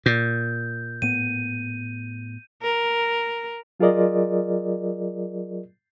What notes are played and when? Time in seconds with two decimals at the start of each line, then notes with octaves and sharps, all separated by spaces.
0.06 A#2 G6
1.02 A2 B3 D#7
2.62 A#4
3.80 F#3 F4 G#4 A#4 D5 D#5